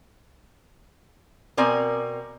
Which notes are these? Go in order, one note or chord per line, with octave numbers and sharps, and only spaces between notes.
B2 C4 A#4 D5 G#5